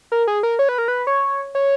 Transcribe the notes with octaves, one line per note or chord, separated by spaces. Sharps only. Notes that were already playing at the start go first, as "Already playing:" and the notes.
A#4
G#4
A#4
C#5
B4
A#4
B4
C#5
C#5